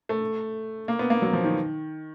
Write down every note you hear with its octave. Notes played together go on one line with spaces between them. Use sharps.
A3
A#3
B3
A#3
F#3
F3
D#3